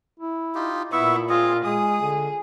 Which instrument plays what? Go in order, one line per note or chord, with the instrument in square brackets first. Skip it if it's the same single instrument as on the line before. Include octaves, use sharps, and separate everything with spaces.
[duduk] E4
[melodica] D#4 F4 G4
[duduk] A#2 [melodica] B3 E5 C#6 [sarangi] E4
[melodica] C4 G#4 D#5 [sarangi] F4
[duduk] G#3 [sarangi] G#4 [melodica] D#6
[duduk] D3